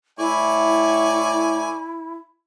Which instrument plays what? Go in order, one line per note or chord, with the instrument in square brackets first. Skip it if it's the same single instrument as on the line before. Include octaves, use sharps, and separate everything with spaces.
[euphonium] A2 [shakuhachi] E4 [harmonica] D5 G#5 C#6